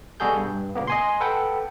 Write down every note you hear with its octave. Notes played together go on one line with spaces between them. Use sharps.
B2 G3 F#4 G#4 A4 G6
G2
A#2 C#3 A#3 B3
D#5 G#5 C6
A4 B4 F#5 G5